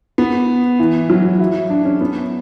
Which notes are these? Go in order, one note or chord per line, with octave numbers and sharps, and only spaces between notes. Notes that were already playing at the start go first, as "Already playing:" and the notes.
B3
E3
F#3
E4
D4
C#4
B3